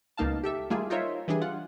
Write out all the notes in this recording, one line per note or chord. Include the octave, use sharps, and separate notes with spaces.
C#2 B2 A#3 D#4 F5 A5
G4 A4 E5
D#3 G3 A3 A#3 F4 G#4
D#4 F4 A#4 C5 C#5 E5
E3 G3 D4 G#4
F4 F#5